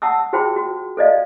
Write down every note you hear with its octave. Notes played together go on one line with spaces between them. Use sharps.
F#5 A5 D#6 E6
F4 F#4 G#4 C5 G5 A5
F#4
A4 C5 D5 D#5 F5